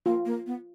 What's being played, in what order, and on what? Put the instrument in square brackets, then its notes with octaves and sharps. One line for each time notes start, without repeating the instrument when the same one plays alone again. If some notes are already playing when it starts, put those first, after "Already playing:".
[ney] A#3 [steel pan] F4
[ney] A#3
B3